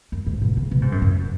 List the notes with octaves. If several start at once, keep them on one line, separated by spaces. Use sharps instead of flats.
F#2
G#2
B2
C#3
B2
G#2
F#2
F#2